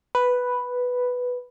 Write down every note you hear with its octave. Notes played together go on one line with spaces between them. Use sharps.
B4